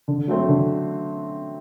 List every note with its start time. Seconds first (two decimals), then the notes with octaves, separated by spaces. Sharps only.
0.08 D3
0.28 F#3 A3 C4
0.48 D3